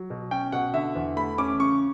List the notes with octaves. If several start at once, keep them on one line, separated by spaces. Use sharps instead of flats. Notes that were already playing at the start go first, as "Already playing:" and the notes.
Already playing: F#3
B2
C#4 G5
B2 F#5
D3 E5
E2
A3 B5
C#4 D6
C#3 C#6